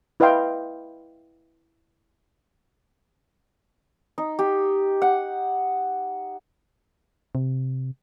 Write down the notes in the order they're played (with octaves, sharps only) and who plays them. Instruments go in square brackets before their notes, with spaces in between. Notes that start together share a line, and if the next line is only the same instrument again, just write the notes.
[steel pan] E4 B4 D#5 F5 G5 C6
[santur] D#4
G4
F#5
[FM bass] C3